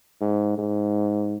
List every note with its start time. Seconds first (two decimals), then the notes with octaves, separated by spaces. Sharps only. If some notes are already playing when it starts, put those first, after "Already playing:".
0.21 G#2
0.58 G#2